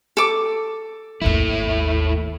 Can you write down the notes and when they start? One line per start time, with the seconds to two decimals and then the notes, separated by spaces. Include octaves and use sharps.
0.17 A4 D6
1.22 G#1 D#2 A3 E4